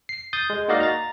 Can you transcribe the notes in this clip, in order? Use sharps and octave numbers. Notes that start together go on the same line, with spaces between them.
C7
D#6 G6 A6
G#3
A#3 D#4 F#4 D5 D#5 F5
A#5 A6